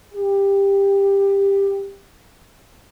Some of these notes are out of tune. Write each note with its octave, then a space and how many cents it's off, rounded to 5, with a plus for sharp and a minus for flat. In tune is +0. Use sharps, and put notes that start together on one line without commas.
G4 +15